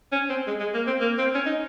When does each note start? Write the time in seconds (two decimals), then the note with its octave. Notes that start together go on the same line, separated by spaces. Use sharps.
0.12 C#4
0.29 C4
0.47 G#3
0.60 G#3
0.74 A#3
0.87 C4
1.01 A#3
1.18 C4
1.35 C#4
1.46 D#4